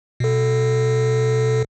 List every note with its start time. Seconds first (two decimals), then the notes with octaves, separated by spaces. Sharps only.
0.20 B2 A4